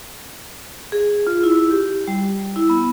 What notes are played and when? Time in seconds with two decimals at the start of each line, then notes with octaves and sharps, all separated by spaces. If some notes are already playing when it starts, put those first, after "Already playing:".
0.92 G#4
1.27 F4
1.43 E4
1.71 G4
2.08 G3
2.56 E4
2.70 B3